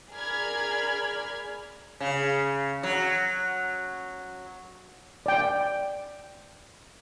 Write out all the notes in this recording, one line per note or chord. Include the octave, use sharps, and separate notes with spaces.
G#4 A#4 D5 B5 F6 G#6
C#3
F#3
D5 G5